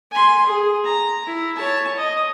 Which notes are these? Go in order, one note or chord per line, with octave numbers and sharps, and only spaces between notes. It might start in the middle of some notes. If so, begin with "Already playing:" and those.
G#5 C6
G#4
A#5
E4
C#5 A5
D#5